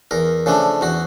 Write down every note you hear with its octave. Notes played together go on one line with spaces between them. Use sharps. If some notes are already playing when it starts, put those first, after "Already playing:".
E2 A#4
C#3 F3 A3 D4
E2 F#4